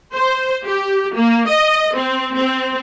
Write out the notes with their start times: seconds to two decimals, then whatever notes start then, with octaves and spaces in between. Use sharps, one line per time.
0.14 C5
0.65 G4
1.15 A#3
1.49 D#5
1.96 C4
2.35 C4